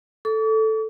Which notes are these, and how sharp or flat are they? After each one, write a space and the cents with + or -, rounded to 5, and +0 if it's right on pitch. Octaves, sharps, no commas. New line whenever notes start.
A4 +0 D6 -45